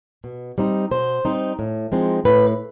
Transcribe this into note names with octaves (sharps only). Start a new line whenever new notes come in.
B2
G3 C4 D#4
B2 C5
G3 C4 D#4
A2
F3 G#3 C4 D#4
A2 B4